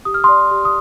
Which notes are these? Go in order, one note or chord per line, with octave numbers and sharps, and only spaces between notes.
G4 D#6
F6
D5 C6 D#6
G4
D#6